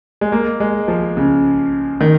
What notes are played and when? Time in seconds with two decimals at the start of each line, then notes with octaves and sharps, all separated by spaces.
0.21 G#3
0.32 A#3
0.60 G#3
0.88 F3
1.17 C#3
2.01 D#3